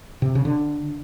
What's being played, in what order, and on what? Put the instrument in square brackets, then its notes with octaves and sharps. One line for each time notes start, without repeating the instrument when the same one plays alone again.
[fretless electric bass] C3
C#3
D3